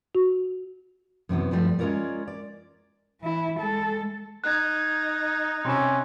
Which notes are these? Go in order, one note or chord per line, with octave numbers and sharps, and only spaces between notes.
F#4
F#2 C3 E3 B3
G2 F3 G3 A3
G#3 C#4 F4 A#4 C#5 D5
D5
E3 E4
G#3 A4
D#4 F#6 G#6
C3 C#4 B5 E6